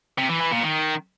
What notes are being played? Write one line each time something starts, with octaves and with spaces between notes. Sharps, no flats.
C3
E3
E3
A#2
D#3